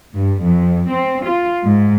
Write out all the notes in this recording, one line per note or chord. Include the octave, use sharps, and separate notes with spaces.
G2
F2
C4
F4
G#2